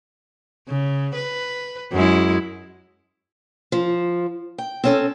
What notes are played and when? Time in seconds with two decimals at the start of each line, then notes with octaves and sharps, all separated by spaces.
0.68 C#3
1.15 B4
1.93 F#2 G#3 E4
3.72 F3
4.58 G5
4.84 C4 C#4 A4